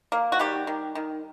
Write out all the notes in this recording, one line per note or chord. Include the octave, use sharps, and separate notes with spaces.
A#3
F#4
D#3 G3 G4
D#3
D#3